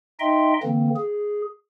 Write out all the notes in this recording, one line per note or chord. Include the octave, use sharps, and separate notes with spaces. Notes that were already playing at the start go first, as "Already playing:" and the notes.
D#4 D#5 E5 G5 C6
D3 E3 A#3 C4
G#4